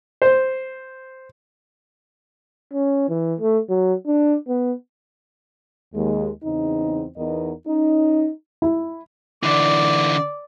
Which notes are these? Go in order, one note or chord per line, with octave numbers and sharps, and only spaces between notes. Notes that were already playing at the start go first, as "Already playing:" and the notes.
C5
C#4
E3
A3
F#3
D4
B3
D#2 G#3
E2 C#3 C4 D#4
E2 B3 D#4 A#4 D#5
C#4 D#4
E4
D3 E3 D5